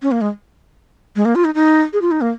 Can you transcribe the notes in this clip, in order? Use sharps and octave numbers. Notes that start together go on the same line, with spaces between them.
C#4
A#3
G#3
G#3
A#3
F4
D#4
D#4
G#4
F4
D#4
A#3